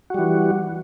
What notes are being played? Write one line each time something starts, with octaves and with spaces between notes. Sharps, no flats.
E3 G3 F#4